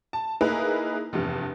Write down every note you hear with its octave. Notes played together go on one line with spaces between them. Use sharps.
A5
A#3 D#4 E4 G#4 A#4 B4
F1 E2 G2